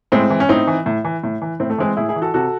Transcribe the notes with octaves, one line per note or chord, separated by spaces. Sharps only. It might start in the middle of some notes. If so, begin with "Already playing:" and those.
A2 G#3 C4
E3
C#4
A2 C4 D#4
E3
A2
E3
A2
E3
A2 C4
A3
E3 G#3 C4
A2 E4 G#4
E4 G#4
E3
F#4 A4
C3 F#4 A4